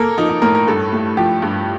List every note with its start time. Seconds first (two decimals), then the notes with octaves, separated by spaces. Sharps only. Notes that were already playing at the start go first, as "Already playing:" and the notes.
Already playing: A#3 A4 A#4
0.17 F3 D#4
0.29 D#4
0.42 A2 A#4
0.55 A#4
0.68 G2 A4
0.92 A3
1.17 F3 G4
1.42 G2